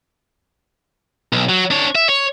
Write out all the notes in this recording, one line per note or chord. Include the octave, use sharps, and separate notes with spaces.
B1
F#3
D4 C#5
E5
C#5